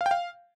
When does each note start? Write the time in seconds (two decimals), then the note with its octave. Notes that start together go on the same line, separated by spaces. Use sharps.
0.01 F5
0.06 G5
0.11 F5